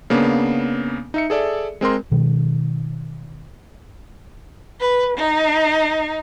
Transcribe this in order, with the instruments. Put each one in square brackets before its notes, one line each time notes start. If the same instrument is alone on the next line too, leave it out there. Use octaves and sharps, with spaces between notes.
[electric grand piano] C#3 A#3 B3 D4
D#4 E5 C#7
G#4 A4 D5 E5
G#3 C4 A#4 C6
[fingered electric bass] B2 D#3 G#3
[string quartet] B4
D#4